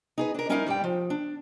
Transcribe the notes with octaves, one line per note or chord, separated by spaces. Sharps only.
D#4 G#4 B4
D4 A#4
G3 C#4 D#4 E4 A#4 F5
G2 G3 G5
F3
D4